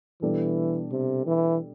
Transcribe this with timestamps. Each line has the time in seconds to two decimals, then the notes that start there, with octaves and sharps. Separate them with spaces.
0.22 B2 E3 G3 D4 A4 D5
0.92 C3
1.27 E3